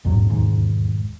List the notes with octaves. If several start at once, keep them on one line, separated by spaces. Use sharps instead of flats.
A#1 E2 G#2 F#3
E1 D#2 G#2